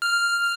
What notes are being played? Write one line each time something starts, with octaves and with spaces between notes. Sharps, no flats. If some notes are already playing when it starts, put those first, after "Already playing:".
F6